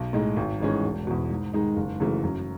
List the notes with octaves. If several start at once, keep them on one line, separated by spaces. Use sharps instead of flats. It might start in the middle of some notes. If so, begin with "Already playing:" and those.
Already playing: B1
A2 G#3 D#4
G#1
G#2 E3 G#3 C#4
E1
E2 B2
G#2
D#3 G#3 D#4
F#1
F#2 C#3 E3 A3
F#2